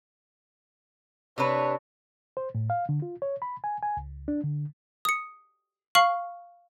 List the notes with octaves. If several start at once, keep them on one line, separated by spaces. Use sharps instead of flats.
C3 D4 B4 C#5
C5
A2
F5
D3
F4
C#5
B5
G#5
G#5
C#2
D4
D3
D#6 C#7
F5 C#6 F6 C7 F#7